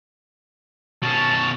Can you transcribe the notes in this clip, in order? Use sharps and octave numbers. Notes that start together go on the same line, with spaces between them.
B2 C#4 A5